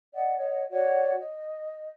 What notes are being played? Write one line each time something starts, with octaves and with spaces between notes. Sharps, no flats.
D5 D#5 F#5
C#5 D#5 F#5
F#4 C#5 D5 F#5
D#5